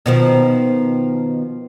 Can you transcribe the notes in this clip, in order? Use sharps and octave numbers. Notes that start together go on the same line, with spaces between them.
B2 D#3 F3